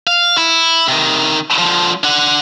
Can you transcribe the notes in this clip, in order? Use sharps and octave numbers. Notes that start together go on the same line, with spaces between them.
F5
E4
C3 D#3
D3 F3
D4 F#5